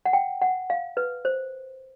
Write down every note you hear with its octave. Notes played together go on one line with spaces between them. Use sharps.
F#5
G5
F#5
F5
B4
C5